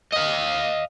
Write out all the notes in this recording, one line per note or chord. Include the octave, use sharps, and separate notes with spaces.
D#5 F5